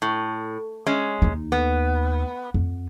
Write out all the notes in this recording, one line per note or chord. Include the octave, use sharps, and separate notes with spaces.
A2
G#3 C#4
D#2 D#4
B3
F2